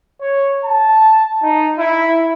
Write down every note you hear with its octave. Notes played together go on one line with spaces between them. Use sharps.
C#5
A5
D#4
E4